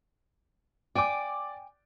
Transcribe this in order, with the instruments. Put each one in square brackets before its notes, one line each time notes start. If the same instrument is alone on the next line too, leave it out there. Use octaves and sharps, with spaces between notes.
[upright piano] D5 D6 [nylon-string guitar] G5 G#5